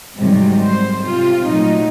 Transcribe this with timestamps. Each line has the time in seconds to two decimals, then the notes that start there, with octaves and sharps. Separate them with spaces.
0.17 G#2 C3 D#3 F#3 G3
0.66 C5
1.04 C3 F4
1.46 A#2 F#3 A3 D#4